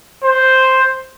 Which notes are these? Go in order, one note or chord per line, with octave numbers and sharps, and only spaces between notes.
C5